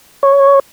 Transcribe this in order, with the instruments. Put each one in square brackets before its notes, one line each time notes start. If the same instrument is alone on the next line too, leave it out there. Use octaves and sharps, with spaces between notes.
[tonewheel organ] C#5